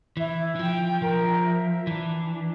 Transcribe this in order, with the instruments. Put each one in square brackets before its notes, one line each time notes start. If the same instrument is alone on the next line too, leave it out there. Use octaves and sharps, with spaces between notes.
[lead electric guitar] E3 [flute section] E4
[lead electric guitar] E3
[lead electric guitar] F3 [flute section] G5
[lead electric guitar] F3 [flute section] A#4
[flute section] E5
[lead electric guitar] E3 [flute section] D4
[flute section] D4